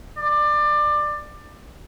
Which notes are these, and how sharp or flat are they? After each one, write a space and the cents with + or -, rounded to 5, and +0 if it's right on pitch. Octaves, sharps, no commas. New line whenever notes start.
D5 +20